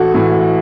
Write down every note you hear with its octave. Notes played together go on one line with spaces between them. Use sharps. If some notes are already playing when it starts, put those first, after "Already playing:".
Already playing: A1 F#4 A4
A2 E3